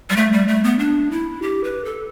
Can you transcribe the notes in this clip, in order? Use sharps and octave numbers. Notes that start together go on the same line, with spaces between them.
G3
A3
G3
A3
B3
D4
E4
G4
B4
A4